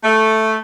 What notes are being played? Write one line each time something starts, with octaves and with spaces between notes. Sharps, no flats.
A3